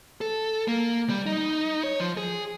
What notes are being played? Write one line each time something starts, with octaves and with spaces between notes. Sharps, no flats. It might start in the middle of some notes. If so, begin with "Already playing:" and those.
A4
A#3
G3
D#4
C#5
F3
G#4